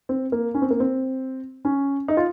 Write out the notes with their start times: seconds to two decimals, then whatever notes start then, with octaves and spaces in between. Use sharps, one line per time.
0.09 C4
0.32 A#3
0.54 C#4
0.62 C4
0.71 A#3
0.80 C4
1.65 C#4
2.08 D#4
2.17 F4